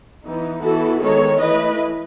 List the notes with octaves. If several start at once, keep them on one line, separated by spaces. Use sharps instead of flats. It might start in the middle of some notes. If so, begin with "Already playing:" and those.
E3 B3 D#4
E3 B3 E4 F#4 A4
D#3 G#3 B3 A4 C#5
E3 A3 E4 B4 D#5